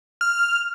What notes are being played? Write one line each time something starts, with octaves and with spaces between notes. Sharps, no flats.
F6